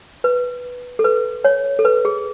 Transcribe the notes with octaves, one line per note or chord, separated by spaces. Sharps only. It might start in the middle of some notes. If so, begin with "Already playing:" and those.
B4
A4
B4
C#5
A4
B4
G#4